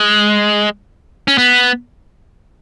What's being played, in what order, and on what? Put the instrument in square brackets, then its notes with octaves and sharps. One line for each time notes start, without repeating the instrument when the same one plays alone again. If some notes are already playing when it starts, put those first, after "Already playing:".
Already playing: [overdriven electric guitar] G#3
C#4
B3